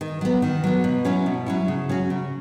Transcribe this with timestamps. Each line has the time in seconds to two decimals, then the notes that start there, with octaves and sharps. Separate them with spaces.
0.01 D#3
0.21 F#3 B3
0.42 D#3
0.64 F#3 B3
0.84 B2
1.05 F#3 C#4 E4
1.26 B2
1.46 F#3 C#4 E4
1.68 C#3
1.89 F#3 C#4 F#4
2.10 C#3